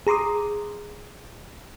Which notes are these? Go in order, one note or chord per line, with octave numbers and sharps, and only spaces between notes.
G#4 A#5 C6 D6 D#6